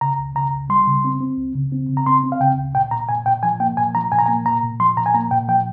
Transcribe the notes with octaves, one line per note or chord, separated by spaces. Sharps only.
C#3 A#5
C#2
C#3 A#5
C#2
G3 C6
C#3
C4
C4
C#2
C#3
C4
C#3
A#5
C4 C6
C4
F5
C#3 G5
C#2
A#2 G5
A#2 A#5
A#2 G#5
A#2 G5
F3 G#5
A#3 G5
A#2 G#5
F3 A#5
A#2 G#5
A#5
A#3 G#5
A#2 A#5
A#2
F3 C6
A#2 A#5
G#5
A#3 A#5
A#2 G5
F3 G5